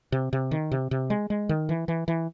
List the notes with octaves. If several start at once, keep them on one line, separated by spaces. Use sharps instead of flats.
C3
C3
D#3
C3
C3
G#3
G#3
D#3
E3
E3
E3